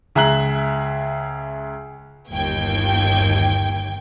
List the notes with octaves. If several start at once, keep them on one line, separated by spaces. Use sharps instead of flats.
C#2 G#4 E5 A#5 F#6 F#7
G1 D#2 G5 G#6